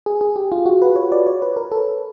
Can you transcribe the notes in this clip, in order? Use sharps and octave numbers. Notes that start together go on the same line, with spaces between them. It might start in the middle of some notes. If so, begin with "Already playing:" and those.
G#4
G#4
G4
F4
F#4
B4
C#5
D5
C#5
B4
A#4
A4